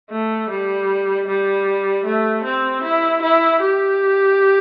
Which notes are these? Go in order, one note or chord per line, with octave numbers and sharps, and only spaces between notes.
A3
G3
G3
A3
C4
E4
E4
G4